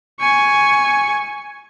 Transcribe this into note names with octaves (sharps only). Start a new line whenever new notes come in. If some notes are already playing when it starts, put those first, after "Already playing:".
G#5 C#6